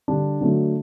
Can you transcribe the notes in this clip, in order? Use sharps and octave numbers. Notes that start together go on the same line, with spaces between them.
D3 G3 D4
D3 F#3 A3